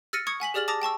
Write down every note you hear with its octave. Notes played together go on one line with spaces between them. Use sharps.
E6 F6 A6 A#6 C#7 D#7
C#6 D#6 G#6 C#7
F#5 G#5 B6 F#7
G4 G#4 D5 F6 A6 F#7
A5 D6 D#6 A6 A#6 F7
G5 A5 C#6 E6